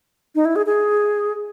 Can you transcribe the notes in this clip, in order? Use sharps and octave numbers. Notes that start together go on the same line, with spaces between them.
D#4
E4
G#4
G#4